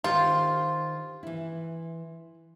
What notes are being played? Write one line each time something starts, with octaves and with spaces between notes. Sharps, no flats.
D#3 F4 G4 C5
E3 E4